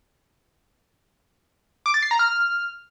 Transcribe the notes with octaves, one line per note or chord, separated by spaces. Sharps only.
D6
A6
C7
A#5
F6